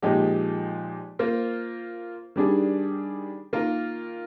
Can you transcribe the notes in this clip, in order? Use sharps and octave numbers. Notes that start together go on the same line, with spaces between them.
A#2 F3 G#3 D#4 G4
A#3 F4 C5
D#3 G3 D4 G#4
D#3 A#3 F4 A#4